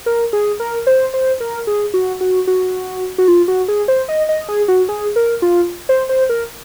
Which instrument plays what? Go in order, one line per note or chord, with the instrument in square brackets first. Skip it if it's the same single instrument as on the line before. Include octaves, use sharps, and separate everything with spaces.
[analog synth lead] A#4
G#4
A#4
C5
C5
A#4
G#4
F#4
F#4
F#4
F#4
F4
F#4
G#4
C5
D#5
D#5
G#4
F#4
G#4
A#4
F4
C5
C5
A#4